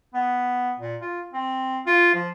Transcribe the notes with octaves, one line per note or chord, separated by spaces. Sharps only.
B3
A#2
F4
C4
F4
F3